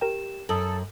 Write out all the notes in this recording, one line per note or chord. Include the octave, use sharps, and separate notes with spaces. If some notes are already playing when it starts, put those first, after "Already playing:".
G4 A#4 G5 E7
F#2 A4 D#6 F#7